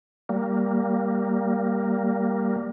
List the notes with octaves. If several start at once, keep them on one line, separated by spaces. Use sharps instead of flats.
G3 A#3